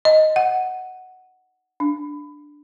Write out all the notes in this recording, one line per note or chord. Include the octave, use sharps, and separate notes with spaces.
D#5
F#5
D4